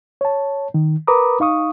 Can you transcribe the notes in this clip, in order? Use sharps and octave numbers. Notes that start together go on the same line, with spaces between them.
C#5 A5
D#3
A#4 B4 A#5 B5 D6 D#6
D#4 F5 C#6 D#6